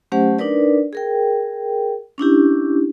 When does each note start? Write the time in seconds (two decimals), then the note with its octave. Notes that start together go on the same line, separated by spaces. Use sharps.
0.12 F#3 A3 C#4 G4 C5 F#5
0.39 D4 D#4 A#4 B4 D5
0.93 G#4 A#4 G5
2.18 C#4 D4 E4 G4